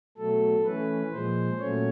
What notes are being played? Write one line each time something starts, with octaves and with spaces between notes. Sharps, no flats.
B2 F#3 A3 A4
E3 A3 C#4 B4
A#2 F3 G#3 C5
A#2 F#3 A3 C#4 C#5